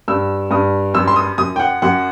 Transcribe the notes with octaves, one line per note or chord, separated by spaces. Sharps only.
G2 E6
G2 D#6
F#2 E6
C6
D#6
F#2 D#6
G5
F#5
F#2 F#5